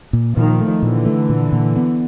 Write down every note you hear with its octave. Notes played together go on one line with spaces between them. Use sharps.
A#2
A#2 D#3 F3
A3
A#2 D3 E3
A3
A#2
A#2
B3